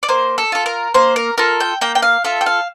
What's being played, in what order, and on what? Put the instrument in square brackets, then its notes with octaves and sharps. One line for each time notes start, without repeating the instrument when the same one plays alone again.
[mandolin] D5
A#3 C5
A4
F4 A4
A#4
A#3 C5
A#4
F4 A4 A#4
G5
A#3 G5
G5
F5
F4 A4 E5
G5
F5